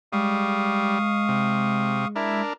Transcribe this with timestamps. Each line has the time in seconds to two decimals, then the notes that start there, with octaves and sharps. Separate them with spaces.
0.13 G3 G#3 F5 C#6 D#6
1.28 C3
2.16 D4 E4 A#4 E5